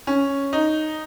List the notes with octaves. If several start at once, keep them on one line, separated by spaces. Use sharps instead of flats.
C#4
D#4